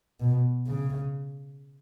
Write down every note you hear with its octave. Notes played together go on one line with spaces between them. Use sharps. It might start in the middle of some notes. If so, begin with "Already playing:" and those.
B2
C#3